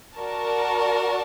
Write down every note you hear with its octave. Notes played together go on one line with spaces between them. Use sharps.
F#4 A#4 D5 A5